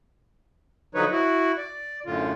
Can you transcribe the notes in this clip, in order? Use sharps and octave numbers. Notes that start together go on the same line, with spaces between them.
D3 F3 F#3 D#4 B4 C#5
E4 F#4
D5
F#2 A2 D3 F4